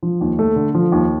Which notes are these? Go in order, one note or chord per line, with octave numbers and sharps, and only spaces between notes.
F3
D#2
A3
D3
F3
D#2